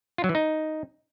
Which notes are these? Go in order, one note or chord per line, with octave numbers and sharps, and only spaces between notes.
F4
F#3
E3
D#4